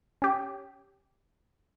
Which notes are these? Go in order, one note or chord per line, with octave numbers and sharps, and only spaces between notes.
C#4 G4